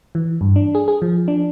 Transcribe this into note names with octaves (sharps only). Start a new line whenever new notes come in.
E3
G2
D4
G#4
G#4
F3
D4